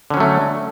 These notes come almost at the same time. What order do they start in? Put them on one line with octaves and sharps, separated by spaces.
D3 C#4 F#3 A3